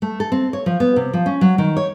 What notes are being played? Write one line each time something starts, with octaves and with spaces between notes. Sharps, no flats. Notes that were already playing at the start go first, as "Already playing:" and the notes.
A3
A4
C4
C#5
F3
B3
C3
F3
C#4
F#3
D#3
C#5